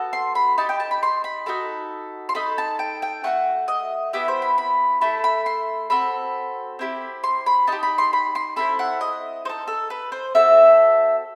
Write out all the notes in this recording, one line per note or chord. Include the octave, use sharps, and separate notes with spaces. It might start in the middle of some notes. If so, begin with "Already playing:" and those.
Already playing: B3 F#4 A4
C6
B5
D#4 G4 A5
G5
A5
B5
C6
B5
D#4 F#4 A4 B5
C6
D#4 A4 B5
A5
G5
G5
A3 D#4 F#4 F#5
D#5
B3 E4 G4 E5
C5
B5
B5
A3 E4 A4 A5
B5
C6
C4 F#4 A4 B5
C4 E4 G4
C6
B5
D#4 G4 A5
B5
C6
B5
C6
C4 E4 A4 B5
F#5
D#5
D#4 A4 C5
A4
B4
C5
C4 F#4 A4 E5